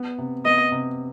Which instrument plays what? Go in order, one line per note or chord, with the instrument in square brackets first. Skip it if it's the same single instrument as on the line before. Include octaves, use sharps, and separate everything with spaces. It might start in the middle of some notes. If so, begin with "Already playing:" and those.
Already playing: [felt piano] B3
C3
[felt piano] B3 [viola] D#5
[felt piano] C3